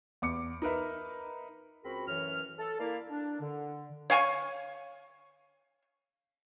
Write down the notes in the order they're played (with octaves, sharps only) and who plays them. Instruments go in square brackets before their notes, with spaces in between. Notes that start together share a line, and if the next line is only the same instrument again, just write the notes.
[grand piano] E2 D6 C#7
D#4 A#4 B4 E5
[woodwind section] C#2 C4 F#4 G#4 A#4 B5
F#2 A2 E3 C#5 F6
A4
A#3 E4 D5 F5
D4
D3
[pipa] C#5 F5 G#5 C#6